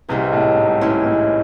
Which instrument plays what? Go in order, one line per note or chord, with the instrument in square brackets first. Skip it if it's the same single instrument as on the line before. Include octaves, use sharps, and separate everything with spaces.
[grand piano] C2 C3 [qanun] E3 G#3 C#4 E4
[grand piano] A2
G#2
[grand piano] A2 [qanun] E3 G#3 C#4 E4
[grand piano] A2